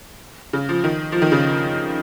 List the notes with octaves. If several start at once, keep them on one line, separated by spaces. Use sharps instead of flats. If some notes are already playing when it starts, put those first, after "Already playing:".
C#3
F3
D#3
F3
D#3
C#3